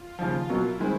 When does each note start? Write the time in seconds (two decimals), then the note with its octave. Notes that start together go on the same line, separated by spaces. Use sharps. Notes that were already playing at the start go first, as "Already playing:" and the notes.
Already playing: F4
0.19 D#2 C#3 F3 F4
0.49 B2 F#3 A#3 E4
0.80 D#3 G#3 C4